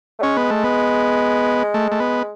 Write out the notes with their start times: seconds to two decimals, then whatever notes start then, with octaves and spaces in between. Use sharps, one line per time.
0.19 A3
0.22 G#3 C#4
0.37 B3
0.51 A3
0.64 B3
1.74 A3
1.92 A3
2.00 B3